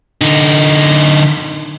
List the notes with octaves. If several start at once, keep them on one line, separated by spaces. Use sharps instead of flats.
D3 D#4